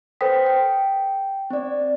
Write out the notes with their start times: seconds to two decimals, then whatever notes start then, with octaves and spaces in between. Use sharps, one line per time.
0.21 A4 B4 C5 G5 D#6 B6
0.46 G5
1.50 C4 D5